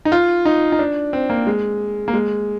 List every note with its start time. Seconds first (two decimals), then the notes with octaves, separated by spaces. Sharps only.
0.05 D#4
0.12 F4
0.45 D#4
0.72 D#4
0.79 D4
1.13 C4
1.30 A#3
1.47 G#3
2.08 A#3
2.14 G#3